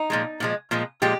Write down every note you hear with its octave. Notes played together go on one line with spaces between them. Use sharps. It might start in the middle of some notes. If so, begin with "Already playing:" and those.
Already playing: D#4
A#2 F3 G#3
A#2 F3 G#3
A#2 F3 G#3
A#2 F3 G#3 G4